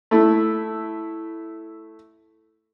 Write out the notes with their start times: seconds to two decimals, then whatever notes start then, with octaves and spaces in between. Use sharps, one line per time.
0.11 A3 E4